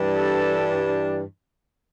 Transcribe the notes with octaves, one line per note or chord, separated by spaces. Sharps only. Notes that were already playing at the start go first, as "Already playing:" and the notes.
Already playing: G2 E3 G3 D4
A4